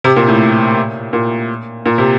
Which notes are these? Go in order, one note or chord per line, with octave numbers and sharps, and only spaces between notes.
C3
A#2
A2
A#2
A#2
C3